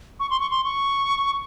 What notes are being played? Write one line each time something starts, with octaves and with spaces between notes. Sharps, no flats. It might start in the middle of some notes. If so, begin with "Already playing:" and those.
C#6
C6
C#6
C6
C#6